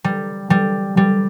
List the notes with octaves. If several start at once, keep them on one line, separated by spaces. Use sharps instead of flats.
G3
G3
G3